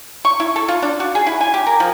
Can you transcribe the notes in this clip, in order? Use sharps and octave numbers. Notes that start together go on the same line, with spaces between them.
C#6
E4
A4
F4
D4
F#4
G#4
E4
G#5
G4
A#4
F3